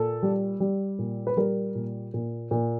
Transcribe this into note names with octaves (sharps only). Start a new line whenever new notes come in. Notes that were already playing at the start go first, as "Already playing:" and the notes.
Already playing: A#2 A4
G3
G3
A#2
B4
G3 A#4
A#2
A#2
A#2